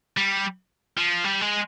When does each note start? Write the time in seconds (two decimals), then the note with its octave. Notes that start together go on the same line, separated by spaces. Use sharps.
0.17 G3
0.98 F3
1.24 G3
1.41 G#3